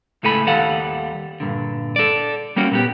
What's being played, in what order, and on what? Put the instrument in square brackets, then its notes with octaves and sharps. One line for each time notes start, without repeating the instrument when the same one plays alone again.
[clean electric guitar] C#2 A2 A4 G#5 B5
D#2 D#3 G3 A4 F5 F#5
G2 A#2 D3
A4 D5
G3 A#3 C#4 F#4
A#2 B3 G4